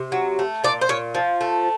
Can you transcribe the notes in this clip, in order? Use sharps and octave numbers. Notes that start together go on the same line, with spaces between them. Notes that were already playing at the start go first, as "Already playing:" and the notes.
Already playing: C3
F#3
A3
A#2 D5
C5
A#2 C#5
F3
A3